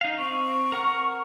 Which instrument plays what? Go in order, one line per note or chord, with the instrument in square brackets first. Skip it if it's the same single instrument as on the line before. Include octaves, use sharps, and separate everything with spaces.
[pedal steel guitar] D#4 F5
[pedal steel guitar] C4 [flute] C#6
[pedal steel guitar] A#4 F#5 F6